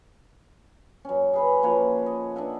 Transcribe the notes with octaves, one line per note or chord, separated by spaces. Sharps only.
F#2 C#4
G#4 B4 B5
F3 A#3 B4 C#5
D#5
D4 D#5 E5 F#5